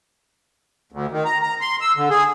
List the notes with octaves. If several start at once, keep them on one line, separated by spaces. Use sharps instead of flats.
D2
D#3
A#5
A#5
C6
E6
D3
G#4